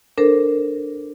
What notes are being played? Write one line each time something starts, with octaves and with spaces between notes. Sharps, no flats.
D4 A4 A#4 C5